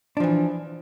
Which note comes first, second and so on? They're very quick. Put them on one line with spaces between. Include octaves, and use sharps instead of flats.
D4 F3 E3